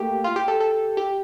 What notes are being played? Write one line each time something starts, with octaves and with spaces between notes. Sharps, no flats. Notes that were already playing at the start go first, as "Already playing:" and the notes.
Already playing: A3 A#3 G4
F4
G4
A4
A4
G4